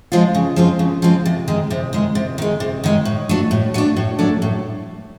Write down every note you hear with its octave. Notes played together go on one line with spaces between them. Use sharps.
F3 G#3 C4 F4
C#3
F3 G#3 C4 F4
C#3
F3 G#3 C4 F4
C3
D#3 G#3
C3
D#3 G#3
C3
D#3 G#3
C3
D#3 G#3
A2
F#3 A3 D4
A2
F#3 A3 D4
A2
F#3 A3 D4
A2